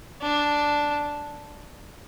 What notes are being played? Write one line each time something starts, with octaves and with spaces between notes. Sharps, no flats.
D4